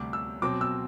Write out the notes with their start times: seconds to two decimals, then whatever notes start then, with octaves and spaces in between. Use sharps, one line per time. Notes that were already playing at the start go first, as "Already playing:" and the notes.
Already playing: D2 C3 G3 D6
0.13 E6
0.42 B2 F#3 C4 D6
0.61 E6